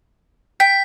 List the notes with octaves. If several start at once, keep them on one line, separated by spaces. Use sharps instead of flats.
G5 B6